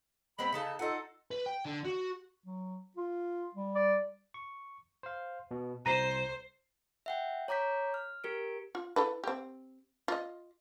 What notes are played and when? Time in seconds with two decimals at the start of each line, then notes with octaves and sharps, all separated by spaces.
0.39 G#3 B3 C4 B5
0.52 C#3 D#4 A4 A5
0.79 D#4 F4 A4 D#5 F#5
1.31 B4
1.46 G5
1.65 D3
1.85 F#4
2.46 F#3
2.97 F4
3.55 G3
3.75 D5
4.34 C#6
5.03 C5 F5
5.51 B2
5.86 C2 C5 A#5 A#6 D#7
7.06 E5 F#5 G5
7.48 C#5 A#5 D6 G6 B6
7.94 F6
8.24 G4 A#4 D7
8.75 F4
8.96 E4 A4 B4
9.24 C4 G4
10.08 F4 D#5